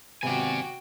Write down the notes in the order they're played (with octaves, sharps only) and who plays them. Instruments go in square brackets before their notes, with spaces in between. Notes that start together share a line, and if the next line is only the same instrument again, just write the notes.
[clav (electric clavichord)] G#1 C3 B3 [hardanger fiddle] F#4 G5 [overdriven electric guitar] D5 G#5